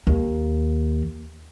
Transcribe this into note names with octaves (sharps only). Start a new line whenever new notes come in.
D#2